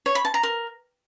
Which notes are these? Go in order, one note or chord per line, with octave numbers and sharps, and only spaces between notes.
C#5
B5
A5
A#5
A#4